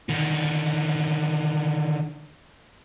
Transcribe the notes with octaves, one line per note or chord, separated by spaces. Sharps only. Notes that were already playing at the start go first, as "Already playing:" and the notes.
D3 D#3